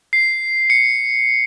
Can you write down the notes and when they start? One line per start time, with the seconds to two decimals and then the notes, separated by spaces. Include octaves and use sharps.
0.13 C7
0.70 C#7